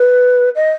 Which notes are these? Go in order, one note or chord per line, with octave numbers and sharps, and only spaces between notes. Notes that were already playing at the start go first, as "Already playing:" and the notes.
Already playing: B4
D#5